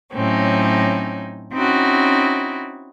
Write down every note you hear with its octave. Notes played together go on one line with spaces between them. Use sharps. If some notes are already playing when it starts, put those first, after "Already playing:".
A2 F#3 C4 C#4 D#4
C4 C#4 D#4 E4 F#4